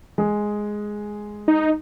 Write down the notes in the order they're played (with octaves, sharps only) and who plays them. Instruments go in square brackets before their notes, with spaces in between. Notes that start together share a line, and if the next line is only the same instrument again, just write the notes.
[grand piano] G#3 G#4
[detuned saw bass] D#4